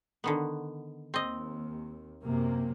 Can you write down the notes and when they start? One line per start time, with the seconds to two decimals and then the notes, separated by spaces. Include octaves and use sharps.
0.24 D3 D#3 B3
1.14 D#2 C4 D#5
2.24 F#2 C3 A#3